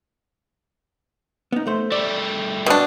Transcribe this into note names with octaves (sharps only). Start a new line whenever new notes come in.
B3 D#4
A3 C5
G3 A3 D5
B2 D4